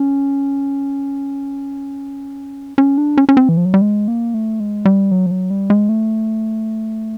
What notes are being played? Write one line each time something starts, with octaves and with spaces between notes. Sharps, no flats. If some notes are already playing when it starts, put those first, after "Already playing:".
Already playing: C#4
C#4
D4
C#4
C#4
C4
E3
F3
F#3
G3
G#3
A#3
A3
G#3
G3
F#3
F3
F#3
G3
G#3
A3